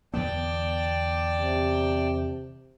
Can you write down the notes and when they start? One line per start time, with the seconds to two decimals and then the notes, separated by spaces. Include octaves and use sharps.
0.14 E2 D3 B3 D5 G5 A5
1.39 C3